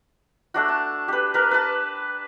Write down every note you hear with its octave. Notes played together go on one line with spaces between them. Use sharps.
A3 D4 F#4
A5
G4 B4
A#4 B4
B4 A5